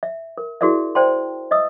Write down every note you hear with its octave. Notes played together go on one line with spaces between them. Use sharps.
E5
A#4
E4 F#4 G#4 A#4 D5 E5
C5 D5 E5 G5 A5 C6
D#5 E5 D#6 E6